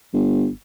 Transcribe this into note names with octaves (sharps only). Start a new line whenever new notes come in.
G1